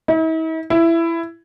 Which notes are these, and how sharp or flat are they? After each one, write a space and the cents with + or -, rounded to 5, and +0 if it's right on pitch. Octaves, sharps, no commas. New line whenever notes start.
E4 -45
E4 +15